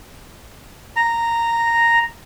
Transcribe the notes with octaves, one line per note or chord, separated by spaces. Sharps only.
A#5